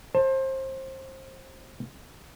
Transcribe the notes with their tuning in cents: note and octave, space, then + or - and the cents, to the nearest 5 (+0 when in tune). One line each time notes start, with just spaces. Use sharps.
C5 +25 A5 +20